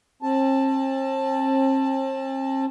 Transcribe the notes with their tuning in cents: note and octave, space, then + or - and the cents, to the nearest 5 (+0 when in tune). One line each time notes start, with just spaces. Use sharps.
C4 +40 A5 +0